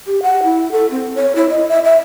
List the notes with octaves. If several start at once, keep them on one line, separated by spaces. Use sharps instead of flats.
G4
F#5
E4
A4
C4
C#5
E4
D#5
E5
E5